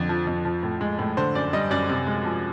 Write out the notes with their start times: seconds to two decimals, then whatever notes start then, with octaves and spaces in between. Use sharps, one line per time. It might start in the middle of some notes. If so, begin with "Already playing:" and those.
Already playing: F2 D3
0.09 F3
0.27 F2
0.45 F3
0.63 A2
0.81 G#3
0.99 A2
1.17 D3 C5
1.35 F#2 D5
1.53 G3 D#5
1.71 F#2 D5
1.89 C3
2.07 G#3
2.25 F3